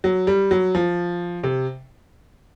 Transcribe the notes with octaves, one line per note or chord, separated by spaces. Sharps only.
F#3
G3
F#3
F3
C3